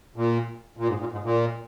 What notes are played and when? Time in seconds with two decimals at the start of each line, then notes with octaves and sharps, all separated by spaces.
0.16 A#2
0.77 A#2
0.88 G#2
1.00 A#2
1.12 G#2
1.24 A#2